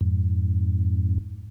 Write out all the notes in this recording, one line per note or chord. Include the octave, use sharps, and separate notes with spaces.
F2 G#2